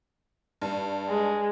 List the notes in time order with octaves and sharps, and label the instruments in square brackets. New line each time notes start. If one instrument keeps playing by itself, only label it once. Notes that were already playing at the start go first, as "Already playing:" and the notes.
[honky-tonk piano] G2
[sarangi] G#3